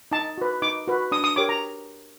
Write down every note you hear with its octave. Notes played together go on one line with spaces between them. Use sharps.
D#4 A5
F#4 B4
D#4 D6
F#4 B4
D4 D#6
D#6
G4 A#4 C#5 D6
A#5